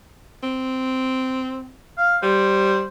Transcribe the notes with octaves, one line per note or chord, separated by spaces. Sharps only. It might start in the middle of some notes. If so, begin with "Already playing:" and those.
C4
F5
G3 C5